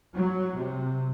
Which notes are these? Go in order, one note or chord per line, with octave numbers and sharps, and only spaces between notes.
F#3
C3